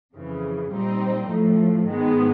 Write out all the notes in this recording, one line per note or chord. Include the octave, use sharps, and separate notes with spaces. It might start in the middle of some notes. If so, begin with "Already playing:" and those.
F2 C#3 E3
A#2 G3 C4 D#4
A2 F3 A3
G#2 D#3 G#3 B3